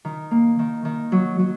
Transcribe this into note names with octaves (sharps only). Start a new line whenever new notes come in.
D#3
A#3
D#3
D#3
F#3
F#3